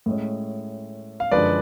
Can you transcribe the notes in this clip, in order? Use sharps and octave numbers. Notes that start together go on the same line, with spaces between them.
A2 G#3 C#4
F5
F#2 D3 F3 G#3 B4 D5